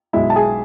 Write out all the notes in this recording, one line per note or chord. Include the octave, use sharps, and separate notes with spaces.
B1 B2 G#3 E4 E5
A5
G#4 G#5